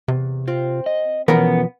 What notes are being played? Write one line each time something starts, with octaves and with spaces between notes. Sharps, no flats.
E2 C3
C4 F4
D#5
E2 B2 E3 F3 B3 C#4 A#4